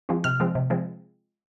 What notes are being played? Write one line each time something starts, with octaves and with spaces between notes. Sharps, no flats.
F3 G#3 C4
C3 F6
F3 G#3 C4
C3
F3 G#3 C4